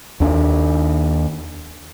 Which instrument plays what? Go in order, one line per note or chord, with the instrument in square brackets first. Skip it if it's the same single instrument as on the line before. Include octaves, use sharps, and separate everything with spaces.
[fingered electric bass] D#2 D4